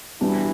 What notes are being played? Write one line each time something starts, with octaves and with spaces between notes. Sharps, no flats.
B2 E3 G3 B3 D4